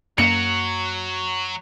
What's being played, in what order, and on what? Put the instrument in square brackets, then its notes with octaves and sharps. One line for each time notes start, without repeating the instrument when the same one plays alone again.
[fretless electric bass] F#2 A#3 [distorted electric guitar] F#3 [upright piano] C#7